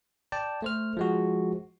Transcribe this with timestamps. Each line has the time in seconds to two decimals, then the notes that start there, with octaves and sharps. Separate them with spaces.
0.32 D5 G5 A5
0.62 A3 C5 F6
0.97 F3 G#3 F#4